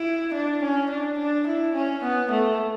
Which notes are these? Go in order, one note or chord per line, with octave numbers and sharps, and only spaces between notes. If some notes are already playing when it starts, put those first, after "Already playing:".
Already playing: E4
D4
C#4
D4
D4
E4
C#4
B3
A3